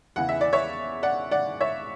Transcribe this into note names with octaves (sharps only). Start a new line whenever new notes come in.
E2 C#3 E3 F#5
E5
D5
C#5 E5
D5 F#5
D5 F#5
C#5 E5